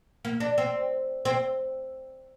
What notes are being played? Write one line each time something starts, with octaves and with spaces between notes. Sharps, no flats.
A#3
D4
C4
C4